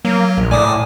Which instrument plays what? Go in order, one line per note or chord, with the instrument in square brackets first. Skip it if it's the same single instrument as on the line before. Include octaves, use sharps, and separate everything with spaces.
[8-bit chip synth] F#3 [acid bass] A#3
[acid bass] A#1
[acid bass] A2 [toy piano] D5 A#5 [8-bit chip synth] G#5 D6 D#6